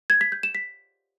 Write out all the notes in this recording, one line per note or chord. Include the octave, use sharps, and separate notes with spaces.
G#6
B6
G6
E7
B6